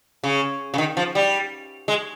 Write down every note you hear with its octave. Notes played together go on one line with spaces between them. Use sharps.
C#3
C#3
D#3
F3
G3
G#3